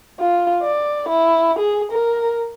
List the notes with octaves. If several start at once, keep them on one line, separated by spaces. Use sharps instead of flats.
F4
D5
E4
G#4
A#4